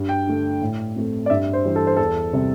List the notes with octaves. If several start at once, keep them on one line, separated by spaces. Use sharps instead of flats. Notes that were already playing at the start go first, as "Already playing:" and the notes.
Already playing: G2
G5
D3 A3
A2
A3 C4
D5
G2 E5
C5
E3 G3
A4
C5
E2 A4
C3 G3 C4